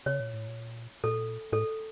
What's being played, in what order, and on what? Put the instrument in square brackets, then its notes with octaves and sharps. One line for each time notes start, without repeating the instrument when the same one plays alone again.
[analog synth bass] C#3 [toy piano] C#5
[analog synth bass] A#2
A2
A#2
[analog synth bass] A#2 [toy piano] A4
[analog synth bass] A2 [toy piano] A4